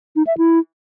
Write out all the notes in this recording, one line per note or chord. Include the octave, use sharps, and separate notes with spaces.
D#4
E5
E4